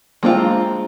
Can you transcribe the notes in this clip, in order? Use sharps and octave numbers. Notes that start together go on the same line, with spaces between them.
G#3 A#3 C4 D4 F4